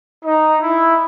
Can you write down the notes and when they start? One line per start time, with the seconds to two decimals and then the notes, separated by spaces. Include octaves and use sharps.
0.24 D#4
0.62 E4